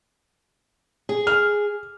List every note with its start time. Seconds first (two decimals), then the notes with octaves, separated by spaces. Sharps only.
1.09 G#4
1.27 F6